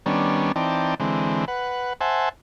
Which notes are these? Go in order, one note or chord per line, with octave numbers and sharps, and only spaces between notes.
D#3 G3 B3 C#4 D4
E3 C4 D#4 D5 G5 A5
D3 E3 G#3 C4
B4 F#5
C5 E5 F#5 G#5 A5